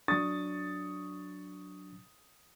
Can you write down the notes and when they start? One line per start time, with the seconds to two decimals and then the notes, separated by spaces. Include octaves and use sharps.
0.08 F#3 D4 C#6 D#6 A6